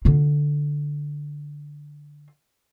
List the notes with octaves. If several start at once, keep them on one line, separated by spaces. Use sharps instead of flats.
D3 F4